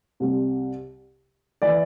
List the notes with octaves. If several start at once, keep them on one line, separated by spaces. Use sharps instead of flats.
C2 C3 G3
E3 D5